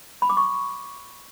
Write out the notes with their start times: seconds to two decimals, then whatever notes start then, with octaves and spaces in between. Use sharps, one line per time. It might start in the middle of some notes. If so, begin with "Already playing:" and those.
0.22 B5
0.30 D6
0.37 C#6